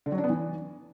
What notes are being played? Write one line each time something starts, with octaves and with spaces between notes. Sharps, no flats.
D3
F#3
D4
B3
E3